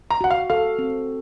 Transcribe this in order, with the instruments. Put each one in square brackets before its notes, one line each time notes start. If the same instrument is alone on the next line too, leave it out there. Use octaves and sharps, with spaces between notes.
[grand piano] A#5
[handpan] F#4 [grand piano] F#5
[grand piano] F5
[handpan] A4 [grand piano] F5
[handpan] C4